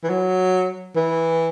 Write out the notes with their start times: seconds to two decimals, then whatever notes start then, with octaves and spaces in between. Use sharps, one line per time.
0.03 E3
0.10 F#3
0.96 E3